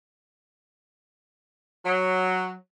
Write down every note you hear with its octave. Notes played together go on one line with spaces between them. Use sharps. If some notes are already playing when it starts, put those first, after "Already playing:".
F#3